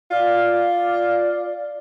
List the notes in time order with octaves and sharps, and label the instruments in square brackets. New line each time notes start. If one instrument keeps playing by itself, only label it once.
[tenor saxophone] F4 [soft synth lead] D5